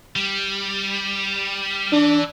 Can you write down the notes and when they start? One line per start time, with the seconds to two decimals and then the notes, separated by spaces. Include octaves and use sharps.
0.16 G3
1.92 E3 D4